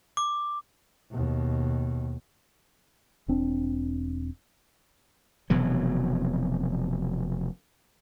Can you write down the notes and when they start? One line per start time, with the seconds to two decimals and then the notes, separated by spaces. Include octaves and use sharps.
0.17 D6
1.11 D#2 B2
3.28 E1 C4 D4
5.50 F1 B2 E3 F#3